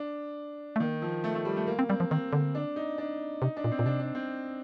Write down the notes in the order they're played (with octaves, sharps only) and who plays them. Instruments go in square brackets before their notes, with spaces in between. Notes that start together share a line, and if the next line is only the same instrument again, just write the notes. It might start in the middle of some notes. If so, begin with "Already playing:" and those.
Already playing: [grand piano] D4
[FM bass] A3
[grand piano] D#3 [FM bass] A#3
[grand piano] F3
A3
A3
G3
A3
A#3
[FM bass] C4
[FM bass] G3 [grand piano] C4
[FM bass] F3
[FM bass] D#3 [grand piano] C4
[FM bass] D3
[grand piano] D4
D#4
D4
[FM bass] C3 [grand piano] D#4
[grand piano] D4
[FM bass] A#2
[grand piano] C4
[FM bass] A#2
[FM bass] C3 [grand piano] D4
[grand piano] D4
C4